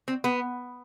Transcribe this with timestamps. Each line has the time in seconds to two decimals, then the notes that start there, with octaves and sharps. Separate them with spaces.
0.08 C4
0.24 B3